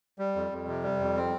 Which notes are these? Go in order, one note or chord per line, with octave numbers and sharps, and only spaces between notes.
G3
F2
F2
C3
G3
F2
C4